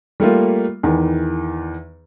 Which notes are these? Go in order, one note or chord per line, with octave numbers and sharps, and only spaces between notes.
G3 A3 A#3 F4
E2 D#3 E3